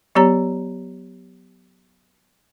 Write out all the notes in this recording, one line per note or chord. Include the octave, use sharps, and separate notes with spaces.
F#3 B3 G4 C#5 A#5